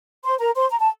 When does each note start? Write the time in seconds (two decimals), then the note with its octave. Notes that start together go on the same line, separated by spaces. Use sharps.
0.24 C5 C6
0.39 A#4 A#5
0.55 C5 C6
0.70 A#5
0.79 A5